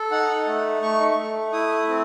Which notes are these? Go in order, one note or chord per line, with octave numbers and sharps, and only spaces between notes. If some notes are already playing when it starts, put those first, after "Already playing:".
Already playing: A4
D#4 F#5
A3
A3 C#6
A3
E4 D#6
C4